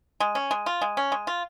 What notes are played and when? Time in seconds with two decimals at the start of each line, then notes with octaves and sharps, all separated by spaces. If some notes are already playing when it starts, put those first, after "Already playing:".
0.20 G#3
0.35 C#4
0.51 G#3
0.66 F4
0.82 G#3
0.97 C#4
1.12 G#3
1.27 F4